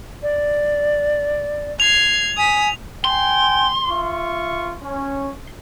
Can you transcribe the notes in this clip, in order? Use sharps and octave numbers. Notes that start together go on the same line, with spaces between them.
D5
G#6 C7 F7
G#5 D#6 B6
G5 G#5 C6
F4 E5 C#6
C#4